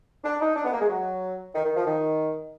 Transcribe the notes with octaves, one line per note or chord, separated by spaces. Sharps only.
D4
D#4
D4
B3
A#3
G#3
F#3
D#3
D#3
F3
D#3